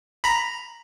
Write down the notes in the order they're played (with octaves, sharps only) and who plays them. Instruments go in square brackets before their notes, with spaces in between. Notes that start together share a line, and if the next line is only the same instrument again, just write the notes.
[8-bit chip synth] A#5 B5